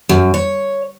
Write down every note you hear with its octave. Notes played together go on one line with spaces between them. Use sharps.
F#2
C#5